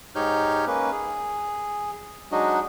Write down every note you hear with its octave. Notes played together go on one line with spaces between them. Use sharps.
G#2 D#4 G4 C#5 F6 G6
A#3 C#4 B4
G#4
F#3 G#3 D4 D#4 F#4 D#5